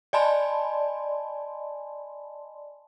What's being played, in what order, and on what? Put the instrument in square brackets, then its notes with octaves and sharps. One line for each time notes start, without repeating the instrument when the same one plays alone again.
[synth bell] D5 D#5 G#5 A5 B5 C6